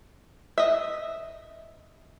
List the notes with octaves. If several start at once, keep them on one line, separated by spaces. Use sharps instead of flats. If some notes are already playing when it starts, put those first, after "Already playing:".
D#5 E5